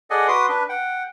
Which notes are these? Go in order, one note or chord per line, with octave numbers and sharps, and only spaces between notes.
G#4 A4 D5 D#5 F#5 G#5
F#4 B4 C6 D6 D#6
D4 B4
F#5 G5